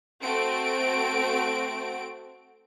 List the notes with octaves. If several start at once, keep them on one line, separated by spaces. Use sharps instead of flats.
A3 C4 F#4 D7